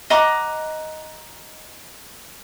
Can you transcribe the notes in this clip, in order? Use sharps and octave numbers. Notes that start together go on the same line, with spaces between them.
D#5 F#5 A#5 D6